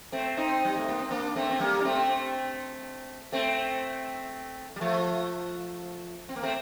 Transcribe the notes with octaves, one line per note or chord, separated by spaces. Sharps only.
A3 C4
C4 D#4
G3
A3
A#3
C4
A#3 D4
A3 C4
C4
G3 A#3
D4
A3 C4
A3 C4
G3
F3 A3
C4
A#3
A3 C4